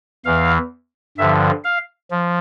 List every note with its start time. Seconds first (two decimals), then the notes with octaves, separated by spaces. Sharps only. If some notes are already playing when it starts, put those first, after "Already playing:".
0.25 E2 E3 F5
1.18 G2 D3 F3 E5
1.64 F5
2.11 F3